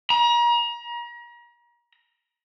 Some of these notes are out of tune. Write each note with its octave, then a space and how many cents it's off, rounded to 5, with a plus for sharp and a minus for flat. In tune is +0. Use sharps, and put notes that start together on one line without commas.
A#5 +35